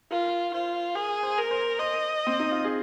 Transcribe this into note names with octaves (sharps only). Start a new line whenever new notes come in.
F4 A#4
F4 C5
G#4 A#4
C5
A#4
C5
C5 D#5
C4
D#4
F4
G#4